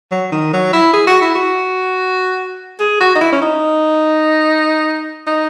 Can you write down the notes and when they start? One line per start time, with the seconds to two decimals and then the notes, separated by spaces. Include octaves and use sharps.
0.12 F#3
0.32 D#3
0.53 F#3
0.73 E4
0.93 G#4
1.07 F#4
1.21 E4
1.35 F#4
2.80 G#4
3.00 F#4
3.15 D#4
3.21 E4
3.32 C#4
3.42 D#4
5.27 D#4